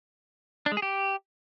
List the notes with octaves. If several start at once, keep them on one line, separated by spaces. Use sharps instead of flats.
D4
G#3
G#4
G4